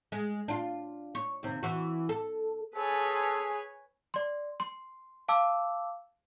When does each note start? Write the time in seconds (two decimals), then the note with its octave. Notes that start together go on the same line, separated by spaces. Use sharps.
0.12 G#3
0.48 D4 F4
1.15 C#5
1.43 D#2 C3
1.63 E3 F#4
2.09 A4
2.76 G#4 A4 B4 C#5 G#5
4.14 D5 C6
4.60 C6
5.28 F5 A5 D6 E6